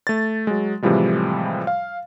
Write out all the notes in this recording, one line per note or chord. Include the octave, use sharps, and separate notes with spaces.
A3 A6
F#3 G#3
A2 C3 E3 F3 G3 G#3
F5